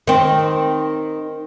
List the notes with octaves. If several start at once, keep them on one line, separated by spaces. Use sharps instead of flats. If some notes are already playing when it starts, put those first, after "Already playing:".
D#3 C4